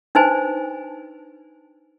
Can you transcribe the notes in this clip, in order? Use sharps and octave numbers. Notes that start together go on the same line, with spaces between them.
D4 D#4 B4 C5 G#5